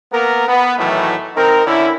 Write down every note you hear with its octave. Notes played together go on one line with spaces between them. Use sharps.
A#3 B3 A#4
B3
A2 D#3 E3 F#3 A3
C4 D#4 A#4
D3 C#4 E4